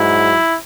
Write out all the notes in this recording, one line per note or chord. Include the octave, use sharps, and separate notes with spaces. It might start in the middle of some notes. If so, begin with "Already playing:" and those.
Already playing: G#2 F#3 E4